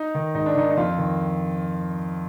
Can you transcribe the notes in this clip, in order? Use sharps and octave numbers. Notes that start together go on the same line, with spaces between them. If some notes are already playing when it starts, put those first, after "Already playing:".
Already playing: D#4
D#3
G#2 D#4
D4
D#3 D#4
D#4
F2 F4
D#3